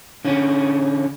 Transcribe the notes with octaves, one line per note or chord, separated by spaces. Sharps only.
D3 C#4